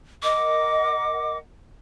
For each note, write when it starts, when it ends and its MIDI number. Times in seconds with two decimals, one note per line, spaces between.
0.23 1.38 70
0.23 1.38 75
0.23 1.38 78
0.23 1.37 86